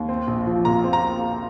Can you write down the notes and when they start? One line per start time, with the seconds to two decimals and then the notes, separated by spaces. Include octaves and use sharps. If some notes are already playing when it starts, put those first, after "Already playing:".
Already playing: D#2
0.09 C4
0.27 A#1
0.47 F3
0.65 A#2 A#5
0.84 C4
0.93 A#5